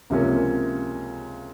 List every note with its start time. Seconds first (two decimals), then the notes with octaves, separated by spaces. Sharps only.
0.10 C#2 C3 F3 A#3 C#4